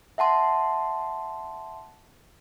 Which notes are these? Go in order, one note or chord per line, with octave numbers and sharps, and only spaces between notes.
E5 F#5 A5 C6